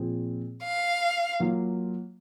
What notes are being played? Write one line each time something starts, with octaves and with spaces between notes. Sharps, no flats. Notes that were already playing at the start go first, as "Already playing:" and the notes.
Already playing: A#2 F3 C4 F4 G#4
F5
F#3 A#3 F4